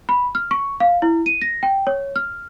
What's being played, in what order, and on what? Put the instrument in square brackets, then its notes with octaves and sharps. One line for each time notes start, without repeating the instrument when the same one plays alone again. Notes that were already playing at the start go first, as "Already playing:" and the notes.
[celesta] B5
F6
C#6
F5
E4
D#7
A#6
G5
C#5
F6